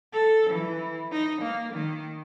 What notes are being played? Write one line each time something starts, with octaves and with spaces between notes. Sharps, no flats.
A4
E3
D#4
A#3
D#3